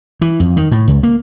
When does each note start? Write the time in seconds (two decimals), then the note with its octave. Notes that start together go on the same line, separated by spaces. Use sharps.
0.21 E3
0.40 F2
0.57 D#3
0.72 A2
0.88 C#2
1.03 A#3